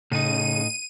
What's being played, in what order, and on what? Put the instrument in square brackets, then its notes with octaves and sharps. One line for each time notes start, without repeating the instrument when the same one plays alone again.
[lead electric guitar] A2 D#4 [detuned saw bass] C#3 [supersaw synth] D#7